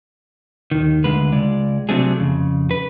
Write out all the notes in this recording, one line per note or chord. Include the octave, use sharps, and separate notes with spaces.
D#2 D#3
D2 D3 G#3 B4
C#2 G#3 D5
C3 F#3 A3 C4 D4 G#4
F2 C#3
B4